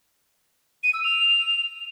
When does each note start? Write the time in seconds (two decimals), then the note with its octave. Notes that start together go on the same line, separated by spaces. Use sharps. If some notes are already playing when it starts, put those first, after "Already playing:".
0.83 D#7
0.94 E6
1.04 F7